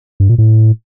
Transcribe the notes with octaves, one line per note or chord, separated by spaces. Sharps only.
G2
A#2
A2